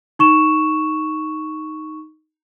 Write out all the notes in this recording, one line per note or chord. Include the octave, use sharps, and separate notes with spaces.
D#4 C#6 E7